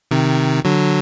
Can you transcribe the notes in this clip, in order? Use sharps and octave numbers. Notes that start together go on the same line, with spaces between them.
C3 D#3
D3 F#3